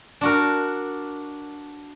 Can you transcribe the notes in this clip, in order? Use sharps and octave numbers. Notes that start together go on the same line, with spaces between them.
D4 F#4 A#4